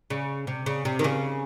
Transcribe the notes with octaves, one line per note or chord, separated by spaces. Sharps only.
C#3
C3
C#3
C3
D#3
C#3